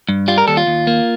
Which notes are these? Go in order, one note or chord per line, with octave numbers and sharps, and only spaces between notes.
G2
G3 F4
A#4
D#2 A4
F4
D#2
A#3